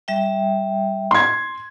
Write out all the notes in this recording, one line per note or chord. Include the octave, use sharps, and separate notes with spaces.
G3 E5 G5
C6 G#6